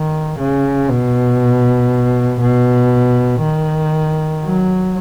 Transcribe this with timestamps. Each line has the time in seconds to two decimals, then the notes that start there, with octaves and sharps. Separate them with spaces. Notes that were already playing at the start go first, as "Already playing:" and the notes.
Already playing: D#3
0.40 C#3
0.91 B2
2.42 B2
3.43 D#3
4.44 F#3